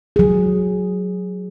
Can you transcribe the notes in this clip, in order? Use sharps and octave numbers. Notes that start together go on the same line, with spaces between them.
F#3 G#4